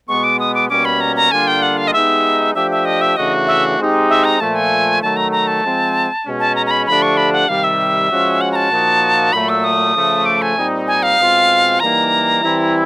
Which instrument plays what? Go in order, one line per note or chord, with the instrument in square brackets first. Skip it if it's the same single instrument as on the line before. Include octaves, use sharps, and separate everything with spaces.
[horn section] B2 G#3 B3 [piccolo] C#6
[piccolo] D6
D#6
D6
[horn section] B2 G3 A#3 C#4 [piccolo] D6
[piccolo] B5
A#5
A#5
[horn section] D3 G3 A#3 D4 F4 [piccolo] G#5
[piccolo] G5
F#5
F5
D#5
[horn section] G#3 B3 D#4 G4 [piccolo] E5
[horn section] F3 A3 D4 G4 [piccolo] E5
[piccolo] E5
D#5
E5
[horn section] C#3 E3 A3 D4 F#4 [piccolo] D#5
[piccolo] E5
[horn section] G#3 C4 D#4 G4
[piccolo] E5
A#5
[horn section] A#2 F3 A3 [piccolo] A5
[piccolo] G#5
[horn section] D#3 F#3 A3 [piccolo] A5
[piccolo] A#5
A#5
A5
[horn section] F3 G#3 C4
B2 G#3 C#4
[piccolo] A5
A#5
A#5
B5
[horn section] D3 F3 A3 D4 G4 [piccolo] B5
[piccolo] C#6
B5
F#5
[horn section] C3 D#3 G3 [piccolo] F5
[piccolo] E5
[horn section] F3 G#3 C#4 F#4
[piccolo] F#5
A#5
A5
[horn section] A#2 F3 A#3 D#4 F#4
[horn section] A#2 F#3 A3 [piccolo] B5
[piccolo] E6
D#6
[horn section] C#3 F3 A3
[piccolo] D6
G#5
[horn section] A#2 G3 C4 D#4
[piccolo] G#5
F5
[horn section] B2 G#3 C4 F4
[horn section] E3 G3 A#3 D#4 [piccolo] A#5
[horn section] E3 G3 C4 E4